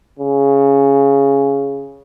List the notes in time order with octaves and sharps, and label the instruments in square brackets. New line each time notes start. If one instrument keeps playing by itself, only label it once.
[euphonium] C#3